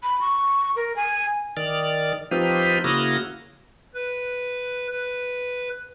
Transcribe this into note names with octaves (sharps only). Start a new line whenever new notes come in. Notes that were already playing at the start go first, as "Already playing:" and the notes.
B5
C#6
A#4
G#5
D#3 D5 F6
F3 C4 D#4 F4 G4 B4
C#3 A#3 E4 F#4 D#6 F6
B4
B4